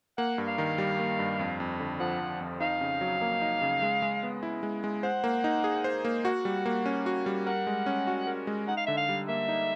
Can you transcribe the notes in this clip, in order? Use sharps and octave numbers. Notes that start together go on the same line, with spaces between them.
A#3 F#5
G2
F5
D#3
G3
A#3
G2
F2
F2
D3
F3 F#5
F2
F2
D#4 F5
C#3
F#3
A#3
D#4
C#3
G#3
G#3
B3
E4
G#3
G#3
C5 F#5
A#3
D#4
G#4
C5
A#3
F#4 F#5
G3
A#3
C#4
F#4
G3
A#4 F#5
G#3
C#4
F#4
A#4
G#3
D#4 F#5
F5
D3 E5
F5
G3
A#3 E5
D#4